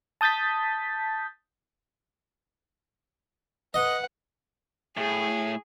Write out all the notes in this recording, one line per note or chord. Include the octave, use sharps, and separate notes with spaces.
A5 D#6 G6 A6 B6
B4 D#5 F#5
A2 G#4